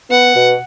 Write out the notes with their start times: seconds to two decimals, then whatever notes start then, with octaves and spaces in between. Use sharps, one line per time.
0.10 B3 F#5
0.35 B2